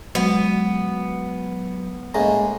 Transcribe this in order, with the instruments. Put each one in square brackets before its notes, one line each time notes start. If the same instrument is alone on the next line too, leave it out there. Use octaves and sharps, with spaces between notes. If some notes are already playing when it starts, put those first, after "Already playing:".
[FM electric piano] F#3 [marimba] G#3 [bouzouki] B3
[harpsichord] A2 G#3 A#3 [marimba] C#4 D#5